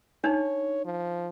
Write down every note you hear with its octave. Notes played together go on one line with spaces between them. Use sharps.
D4 D#4 C#5
F3